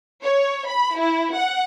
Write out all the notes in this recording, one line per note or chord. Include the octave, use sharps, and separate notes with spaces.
C#5
B5
E4
F#5